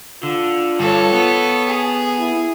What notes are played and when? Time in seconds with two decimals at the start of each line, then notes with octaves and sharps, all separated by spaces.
0.23 D3 F4
0.79 G2 A4 C#5
1.13 B3
1.68 G#4
2.19 E4